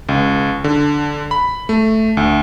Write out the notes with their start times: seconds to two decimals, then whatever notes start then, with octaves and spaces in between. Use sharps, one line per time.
0.09 C#2
0.64 D3
1.31 B5
1.69 A3
2.17 D2